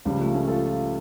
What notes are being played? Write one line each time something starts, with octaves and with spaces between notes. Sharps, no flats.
C#2 C#3 F3 G3
A3
A3 C#4
F4 A4